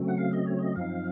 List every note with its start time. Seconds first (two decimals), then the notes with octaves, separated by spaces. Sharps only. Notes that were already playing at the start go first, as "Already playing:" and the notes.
Already playing: C#3 F#3 A3 C4
0.08 F#5
0.18 F5
0.33 D#5
0.46 C#5
0.59 D#5
0.76 F#2 F3 C4 D#4 F5